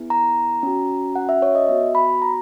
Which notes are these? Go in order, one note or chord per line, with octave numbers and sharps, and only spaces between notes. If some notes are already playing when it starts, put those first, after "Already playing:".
Already playing: B3 E4 G#4
A#5
C#4 F#4
F#5
E5
C#5
D#5
B3 F#4 E5
B5
A#5